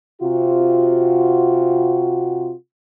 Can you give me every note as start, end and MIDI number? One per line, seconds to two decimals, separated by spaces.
0.22 2.53 48
0.22 2.53 65
0.22 2.53 66